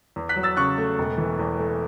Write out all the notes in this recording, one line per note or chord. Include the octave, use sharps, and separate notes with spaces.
E2
F#6 B6
F#3
E6 A6
C#3 C#6 F#6
A3
E1
E3
E2
A3